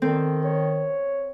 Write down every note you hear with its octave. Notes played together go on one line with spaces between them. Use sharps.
D#3 C4 A4
C#5